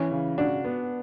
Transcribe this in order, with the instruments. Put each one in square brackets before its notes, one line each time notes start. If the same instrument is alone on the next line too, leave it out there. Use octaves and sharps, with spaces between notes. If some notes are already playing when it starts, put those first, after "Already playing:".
Already playing: [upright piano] E3 [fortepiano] C#4
[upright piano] C#3
[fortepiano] D4 [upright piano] F#4
[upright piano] B3